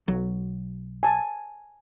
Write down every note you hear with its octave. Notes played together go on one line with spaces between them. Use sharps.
B1 F#3
G#5 A5